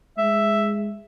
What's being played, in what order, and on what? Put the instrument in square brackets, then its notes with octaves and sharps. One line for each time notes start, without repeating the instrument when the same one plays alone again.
[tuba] G#3 [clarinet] E5